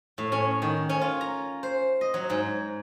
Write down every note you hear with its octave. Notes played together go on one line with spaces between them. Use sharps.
A2
C#4
D#3
C#4
F4
A#5
C5
D#5
F#3
G#2